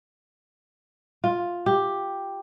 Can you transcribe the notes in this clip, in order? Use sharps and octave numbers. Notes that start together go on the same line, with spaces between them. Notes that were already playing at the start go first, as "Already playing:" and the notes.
F4
G4